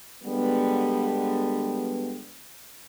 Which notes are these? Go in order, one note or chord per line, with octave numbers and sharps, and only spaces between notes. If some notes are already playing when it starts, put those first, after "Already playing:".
D3 G3 G#3 B3